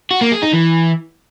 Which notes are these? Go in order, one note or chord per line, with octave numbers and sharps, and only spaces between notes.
F#4
A#3
G#4
D#4
E3